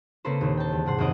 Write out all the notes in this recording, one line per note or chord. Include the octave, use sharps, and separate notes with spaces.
C#3 A#3 C4 A4 B4 C5
D#2 A#2
G5 A5
E2
G#2 C3 F#5 C6
F#1 D#2 C4 D#5 F#5 D7